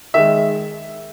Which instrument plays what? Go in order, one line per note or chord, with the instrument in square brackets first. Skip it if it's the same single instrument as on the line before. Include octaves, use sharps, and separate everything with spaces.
[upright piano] D#3 G#3 E5